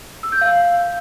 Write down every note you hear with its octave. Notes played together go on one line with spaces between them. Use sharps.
E6
G6
F5